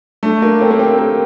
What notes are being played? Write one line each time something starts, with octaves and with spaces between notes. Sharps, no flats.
A3 D4
A#3 D4
A3 C4
A#3
C4 G4
A3 A#3